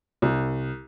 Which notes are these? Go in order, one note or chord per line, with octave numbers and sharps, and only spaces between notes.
C2